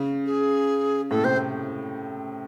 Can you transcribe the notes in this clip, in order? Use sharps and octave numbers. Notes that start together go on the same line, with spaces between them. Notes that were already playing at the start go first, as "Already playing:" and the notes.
Already playing: C#3
G#4
A2 A4
C3 C5